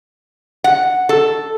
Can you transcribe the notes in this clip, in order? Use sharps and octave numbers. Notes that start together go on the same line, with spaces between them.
F#5
A4